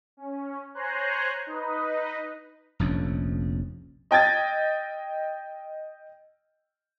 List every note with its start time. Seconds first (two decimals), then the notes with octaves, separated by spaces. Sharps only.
0.17 C#4
0.75 C5 C#5 G#5 A#5 C6 F#6
1.47 D#4 B4 D#5
2.79 F1 A#1 F2 C#4
4.11 D#5 G5 G#6 A6